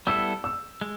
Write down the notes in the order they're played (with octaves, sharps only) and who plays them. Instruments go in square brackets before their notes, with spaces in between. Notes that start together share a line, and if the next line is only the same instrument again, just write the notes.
[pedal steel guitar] G3 B3 E4 A4 [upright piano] E6
[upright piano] E6
[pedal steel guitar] G#3